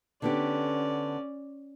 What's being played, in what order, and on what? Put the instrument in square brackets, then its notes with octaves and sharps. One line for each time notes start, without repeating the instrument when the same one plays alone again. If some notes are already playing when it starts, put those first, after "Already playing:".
[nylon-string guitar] D3 B3 G4 [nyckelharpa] C#4 D5